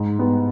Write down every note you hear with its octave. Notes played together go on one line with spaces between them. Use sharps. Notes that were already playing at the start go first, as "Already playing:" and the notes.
Already playing: G#2
G3 B3